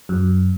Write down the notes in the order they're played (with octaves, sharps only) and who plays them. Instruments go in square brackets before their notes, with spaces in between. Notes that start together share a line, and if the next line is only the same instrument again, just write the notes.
[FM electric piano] F#2